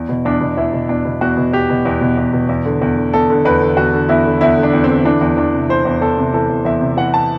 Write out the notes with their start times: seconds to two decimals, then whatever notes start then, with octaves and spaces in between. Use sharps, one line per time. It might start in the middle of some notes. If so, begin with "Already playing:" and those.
Already playing: E2
0.09 B2
0.25 E2 D4
0.41 B2
0.57 E2 E4
0.73 B2
0.89 E2 D4
1.05 B2
1.21 E2 F#4
1.37 B2
1.53 E2 G4
1.70 B2
1.85 E2
2.01 B2
2.17 E2
2.33 B2
2.49 E2
2.65 D3
2.82 E2
2.97 D3
3.13 E2 A4
3.30 D3
3.45 E2 B4
3.61 D3
3.77 E2 F#4
3.93 D3
4.09 E2 E4
4.25 D3
4.41 E2 E4
4.57 D3
4.63 D4
4.73 E2
4.84 C4
4.89 D3
5.05 E3 D4
5.21 E2
5.37 E2 D4
5.53 C3
5.69 E3 C5
5.85 E2
6.01 E2 A4
6.18 C3
6.34 E3 A4
6.49 E2
6.65 E2 E5
6.81 C3
6.97 E3 F#5
7.14 A5